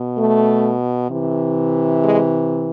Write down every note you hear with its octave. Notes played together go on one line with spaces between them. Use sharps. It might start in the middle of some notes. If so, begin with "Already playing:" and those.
Already playing: B2
A3
C3 E3
G#3